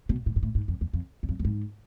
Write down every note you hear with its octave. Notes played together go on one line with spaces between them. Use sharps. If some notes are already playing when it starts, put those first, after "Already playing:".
B2
A2
G#2
A2
G#2
F2
E2
F2
E2
F2
F2
G#2